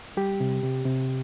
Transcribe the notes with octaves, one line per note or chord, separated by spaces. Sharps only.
G3 G4
C3
C3
C3